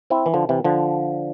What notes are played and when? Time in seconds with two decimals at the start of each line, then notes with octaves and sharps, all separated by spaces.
0.10 C4 E4
0.26 E3
0.34 D3 F3
0.49 C3 E3
0.64 D3 F3